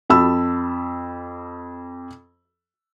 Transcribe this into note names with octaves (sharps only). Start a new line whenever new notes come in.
F2 A5 B5 E6